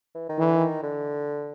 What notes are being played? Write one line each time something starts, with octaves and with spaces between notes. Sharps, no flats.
E3
D#3
D3 E3
D#3
D3